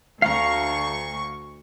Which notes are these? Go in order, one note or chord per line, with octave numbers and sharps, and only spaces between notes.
D2 F5 A#5 C#6